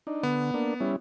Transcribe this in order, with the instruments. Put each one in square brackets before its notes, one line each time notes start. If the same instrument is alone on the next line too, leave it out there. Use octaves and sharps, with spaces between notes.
[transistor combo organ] D4 D#4
[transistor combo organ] D3 [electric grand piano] B3
[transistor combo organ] A#3 D4
G3 C#4 E4